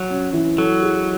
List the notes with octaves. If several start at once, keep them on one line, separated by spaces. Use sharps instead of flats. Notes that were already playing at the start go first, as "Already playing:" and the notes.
Already playing: F#3
C#4
E3
F#3 A4
G#3